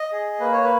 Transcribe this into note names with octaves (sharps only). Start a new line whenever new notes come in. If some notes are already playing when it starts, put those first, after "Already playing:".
Already playing: D#5
G#4
A#3 B4
C#5
B4